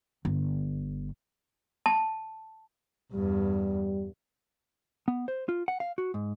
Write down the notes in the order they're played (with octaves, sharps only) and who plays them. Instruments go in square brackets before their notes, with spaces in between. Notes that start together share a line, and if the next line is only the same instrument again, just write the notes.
[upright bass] G1
[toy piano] A5
[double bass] E2 G2 [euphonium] G3
[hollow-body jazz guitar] B3
C5
F4
F#5
F5
F#4
G#2